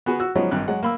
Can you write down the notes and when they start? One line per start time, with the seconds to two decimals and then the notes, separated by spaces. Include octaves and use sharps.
0.06 B3 F#4 G#4 B4
0.20 F#4 E6
0.35 F3 F#3 G#3 B3 C#4 D#4
0.51 G#1 G2 F#6
0.68 F#3 G#3 F#5
0.83 A#3 B5 E6